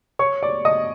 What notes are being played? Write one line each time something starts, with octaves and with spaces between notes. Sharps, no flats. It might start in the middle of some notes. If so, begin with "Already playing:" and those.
C#5 C#6
D5 D6
D#5 D#6